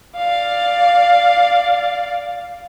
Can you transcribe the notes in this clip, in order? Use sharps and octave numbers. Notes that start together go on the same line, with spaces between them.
D5 F5